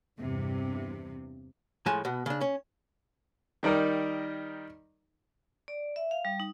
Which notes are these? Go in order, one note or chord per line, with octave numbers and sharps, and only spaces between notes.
E2 G2 C3
A2 F3 G#3 G#5 A5
B2 B3
C#3 D4
C#4
D#3 G3 D#4 A#4 D5
D5
E5
F5
G3
D#4